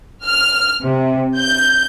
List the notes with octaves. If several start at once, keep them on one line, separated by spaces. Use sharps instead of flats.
F6
C3
G6